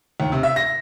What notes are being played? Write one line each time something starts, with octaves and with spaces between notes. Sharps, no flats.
D#2
C3
E5
A#6